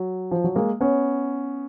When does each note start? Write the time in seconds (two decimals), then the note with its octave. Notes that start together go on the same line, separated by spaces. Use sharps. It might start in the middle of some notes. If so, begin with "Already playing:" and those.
Already playing: F#3
0.31 F3
0.44 F#3
0.56 G#3 A#3
0.81 B3 C#4